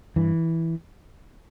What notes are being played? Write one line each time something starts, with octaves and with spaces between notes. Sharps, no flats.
G2 E3